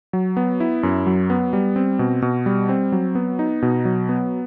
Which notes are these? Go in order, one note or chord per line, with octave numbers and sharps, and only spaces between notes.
F#3
B3
E4
F#2
F#3
B3
G3
C4
B2
B2
G3
C4
F#3
B3
D#4
B2
F#3
B3